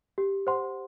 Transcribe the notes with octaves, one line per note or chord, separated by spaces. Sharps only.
G4
C5 F#5 C6